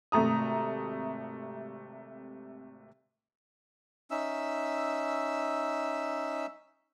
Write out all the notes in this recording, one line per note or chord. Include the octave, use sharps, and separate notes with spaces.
G#1 C3 A3 A#5 D#6
C#4 D#4 E5 E6